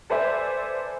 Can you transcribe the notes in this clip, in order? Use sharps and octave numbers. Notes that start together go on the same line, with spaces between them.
A4 B4 C5 D5 E5 G#5